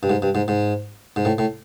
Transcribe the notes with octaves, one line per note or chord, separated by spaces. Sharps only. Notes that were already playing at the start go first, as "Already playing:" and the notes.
G2
G#2
G2
G#2
G#2
G#2
A2
A2